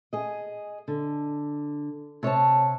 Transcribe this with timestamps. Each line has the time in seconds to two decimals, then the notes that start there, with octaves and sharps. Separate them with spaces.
0.13 G#4 D#5
0.88 D3
2.23 C3 C#5 D#5 A5